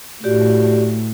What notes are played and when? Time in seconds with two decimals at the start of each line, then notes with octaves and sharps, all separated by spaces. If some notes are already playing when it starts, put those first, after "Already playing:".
0.24 A2 F#4 G4 D5